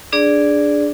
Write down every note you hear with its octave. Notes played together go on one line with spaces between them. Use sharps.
D4 G#4 D5